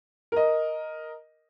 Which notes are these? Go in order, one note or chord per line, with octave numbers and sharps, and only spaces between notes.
A#4 D#5